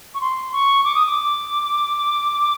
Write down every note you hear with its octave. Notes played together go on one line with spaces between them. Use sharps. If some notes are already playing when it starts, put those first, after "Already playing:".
C#6
C6
C#6
D6
D#6
D6